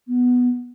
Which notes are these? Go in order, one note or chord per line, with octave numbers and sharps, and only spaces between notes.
B3